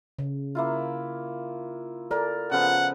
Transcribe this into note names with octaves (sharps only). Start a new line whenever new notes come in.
C#3
A#3 E4 F4
A4 A#4 D5
C#3 F3 B3 F#5